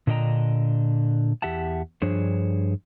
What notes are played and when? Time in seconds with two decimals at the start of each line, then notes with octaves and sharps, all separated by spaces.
0.07 A#2 D3 D4 D#5 G5 A#5
1.42 E2 G4 E5 F#5 A5
2.02 G2 F3 D4 G#4 C5 C#5